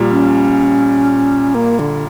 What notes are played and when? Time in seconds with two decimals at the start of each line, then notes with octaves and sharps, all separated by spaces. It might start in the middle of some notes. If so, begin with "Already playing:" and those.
Already playing: A#1 A#2 G3
0.11 C#4
1.55 A#3
1.79 D3